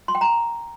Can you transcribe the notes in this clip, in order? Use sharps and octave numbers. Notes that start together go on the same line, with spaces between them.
C6
G5
A#5